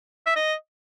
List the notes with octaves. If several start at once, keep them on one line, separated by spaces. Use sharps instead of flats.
E5
D#5